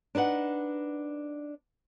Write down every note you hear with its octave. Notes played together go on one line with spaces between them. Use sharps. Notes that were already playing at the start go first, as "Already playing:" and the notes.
D4 D#4 B4 F#5